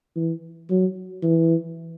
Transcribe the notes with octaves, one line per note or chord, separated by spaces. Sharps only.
E3
F#3
E3